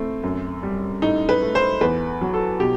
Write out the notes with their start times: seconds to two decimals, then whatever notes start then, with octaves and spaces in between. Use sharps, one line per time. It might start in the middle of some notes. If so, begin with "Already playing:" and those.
Already playing: A2 A3 C4
0.24 F#2
0.63 G3
1.02 A2 D#4
1.29 B4
1.42 A3
1.55 C5
1.81 E2 B4
2.21 F#3
2.34 A4
2.60 B2 G4